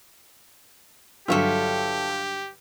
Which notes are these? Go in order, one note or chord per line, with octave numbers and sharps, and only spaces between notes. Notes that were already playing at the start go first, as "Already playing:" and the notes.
G2 D3 F#3 F4 G4 A4 C#5 E5